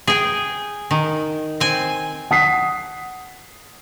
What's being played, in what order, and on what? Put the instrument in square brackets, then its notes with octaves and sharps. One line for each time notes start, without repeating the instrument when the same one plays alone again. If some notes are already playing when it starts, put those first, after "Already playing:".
[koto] G#4 G5
D#3
C4 G#5
[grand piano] F#5 D#6 B6 C7